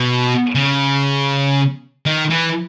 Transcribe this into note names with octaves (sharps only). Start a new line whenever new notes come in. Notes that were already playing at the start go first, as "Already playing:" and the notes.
Already playing: B2
C#3
D#3
E3